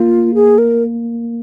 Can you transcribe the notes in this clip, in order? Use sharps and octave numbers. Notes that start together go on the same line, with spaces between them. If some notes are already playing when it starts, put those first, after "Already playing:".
Already playing: A#3 F4
G#4
A#4